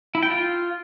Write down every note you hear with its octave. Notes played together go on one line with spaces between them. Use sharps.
E4
G5
F4